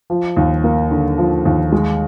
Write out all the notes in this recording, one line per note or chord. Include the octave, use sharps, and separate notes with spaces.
F3
D#2
A#3
D3
F3
D#2
G#3